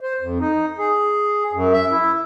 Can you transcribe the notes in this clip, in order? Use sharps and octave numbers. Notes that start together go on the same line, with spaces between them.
C5
F2
D#4
G#4
F#2
E5
E4